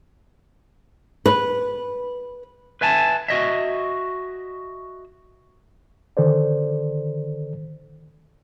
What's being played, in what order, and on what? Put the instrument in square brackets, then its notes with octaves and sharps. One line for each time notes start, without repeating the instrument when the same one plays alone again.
[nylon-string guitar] B4
[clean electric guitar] B4 E5 G#5 A5
F#4 D#5 E5
[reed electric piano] D3 D#3 A4 C5 D5